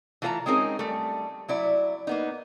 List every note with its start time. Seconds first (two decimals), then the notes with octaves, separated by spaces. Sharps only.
0.22 E3 A3 F4 C5 A5 A#5
0.46 G#3 C4 C#4 D#4 G#4 A#4
0.79 G3 A3
1.48 F#3 E4 D5
2.07 A#3 B3 D#4